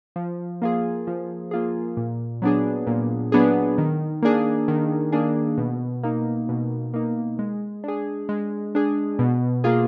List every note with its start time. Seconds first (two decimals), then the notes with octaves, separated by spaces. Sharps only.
0.16 F3
0.62 A#3 F4 G#4
1.07 F3
1.51 A#3 F4 G#4
1.97 A#2
2.42 F#3 B3 D4 G#4
2.87 A#2
3.32 F#3 B3 D4 G#4
3.78 D#3
4.22 A#3 D4 G#4
4.68 D#3
5.12 A#3 D4 G#4
5.58 B2
6.03 A#3 D#4
6.49 B2
6.94 A#3 D#4
7.39 G#3
7.84 D4 G#4
8.29 G#3
8.75 D4 G#4
9.19 B2
9.64 A#3 F4 G#4